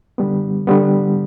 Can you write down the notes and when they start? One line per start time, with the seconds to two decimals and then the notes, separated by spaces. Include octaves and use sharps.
0.18 D3 G3 B3
0.67 D3 G3 B3